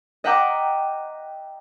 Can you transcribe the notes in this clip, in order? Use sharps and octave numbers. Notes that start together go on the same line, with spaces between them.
D#5 E5 F#5 G5 A#5 D6